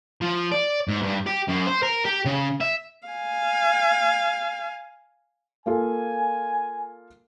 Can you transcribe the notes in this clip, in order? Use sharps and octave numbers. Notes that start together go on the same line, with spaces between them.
F3
D5
G#2
G2
G4
F#2
C5
A#4
G4
C#3
E5
F5 G#5
A#3 F4 A4 G#5